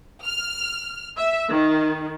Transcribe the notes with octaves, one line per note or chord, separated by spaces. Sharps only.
F6
E5
D#3